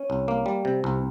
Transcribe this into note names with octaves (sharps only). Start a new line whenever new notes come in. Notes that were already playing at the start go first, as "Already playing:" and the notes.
Already playing: C#4
C2
A#3
G3
C3
C2